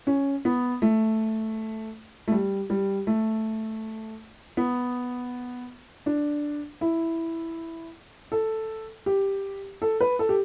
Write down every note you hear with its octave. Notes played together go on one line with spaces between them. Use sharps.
C#4
B3
A3
A3
G3
G3
A3
B3
D4
E4
A4
G4
A4
B4
A4
G4